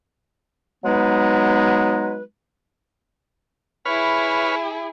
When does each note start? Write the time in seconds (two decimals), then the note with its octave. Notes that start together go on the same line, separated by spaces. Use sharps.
0.85 F#3 G#3 B3 D#4 B4
3.85 E4 G#4 B4 C#5 F6